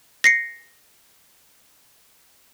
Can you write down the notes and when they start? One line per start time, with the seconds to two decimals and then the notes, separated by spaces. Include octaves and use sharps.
0.24 A#6 C7 C#7